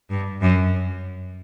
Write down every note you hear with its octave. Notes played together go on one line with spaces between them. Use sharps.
G2
F#2